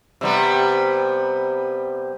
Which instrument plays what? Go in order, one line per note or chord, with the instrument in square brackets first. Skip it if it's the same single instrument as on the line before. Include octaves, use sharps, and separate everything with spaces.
[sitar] C3 G3 B3